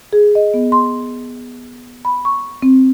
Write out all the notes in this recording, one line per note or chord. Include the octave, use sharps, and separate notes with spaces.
G#4
D#5
B3
C6
B5
C#6
C4